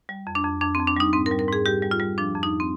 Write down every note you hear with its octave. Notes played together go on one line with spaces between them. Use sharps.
G3
F2
D4
F2
F2 D4
F2 C4
D4
G3 D#4
G#2 C4
A#4
G3
A#4
G#2 G#4
G3 G4
G3
F4
G3
F3 D4
F2
D#4
C4